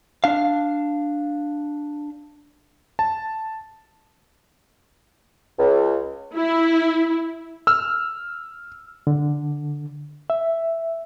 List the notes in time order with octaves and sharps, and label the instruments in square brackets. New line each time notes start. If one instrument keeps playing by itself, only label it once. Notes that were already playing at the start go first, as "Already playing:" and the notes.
[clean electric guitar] D4 F5
[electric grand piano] A5
[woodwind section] C#2
[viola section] E4
[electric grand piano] E6 F6
[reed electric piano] D3
E5